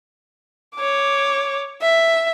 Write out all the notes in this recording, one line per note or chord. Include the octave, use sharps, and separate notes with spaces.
C#5 D6
E5